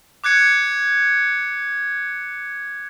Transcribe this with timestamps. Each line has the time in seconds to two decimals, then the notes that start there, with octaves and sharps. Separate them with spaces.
0.24 D6 F#6 G#6 C#7